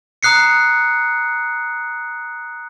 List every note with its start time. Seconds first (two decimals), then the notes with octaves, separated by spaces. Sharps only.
0.23 A#5 D#6 F#6 C7 C#7